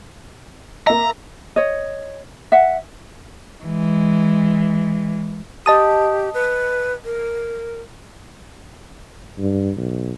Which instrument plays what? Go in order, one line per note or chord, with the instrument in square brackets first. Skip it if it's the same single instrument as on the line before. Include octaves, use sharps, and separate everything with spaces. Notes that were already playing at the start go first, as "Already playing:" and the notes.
[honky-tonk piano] A#3 E5 [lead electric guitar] A#5
[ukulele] C#5 D#5
E5 F#5
[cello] E3 G#3
[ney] G4 [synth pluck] D#5 A5 D#6
[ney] B4
A#4
[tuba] G2
B1